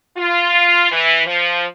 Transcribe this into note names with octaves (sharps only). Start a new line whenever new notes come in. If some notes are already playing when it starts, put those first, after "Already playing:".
F4
E3
F3